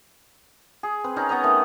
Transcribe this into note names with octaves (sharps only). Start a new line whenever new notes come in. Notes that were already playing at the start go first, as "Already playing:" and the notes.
G#4
C4 B4
C#4 D#4 A#4 A#5
B3 C#5 D#5 A#5
D#3 A3